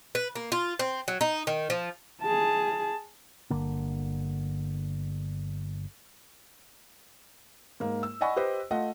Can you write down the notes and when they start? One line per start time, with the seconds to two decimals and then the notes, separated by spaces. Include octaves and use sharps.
0.15 B4
0.36 A#3
0.52 F4
0.79 C4
1.08 F#3
1.21 D#4
1.47 D#3
1.70 F3
2.22 G#4 A5
3.50 G1 D3 A#3
7.80 G#2 A#3
8.03 E6
8.21 D5 D#5 F#5 G#5 B5 C#6
8.36 G4 B4 C5 D#5
8.71 A3 F4 D#5 F#5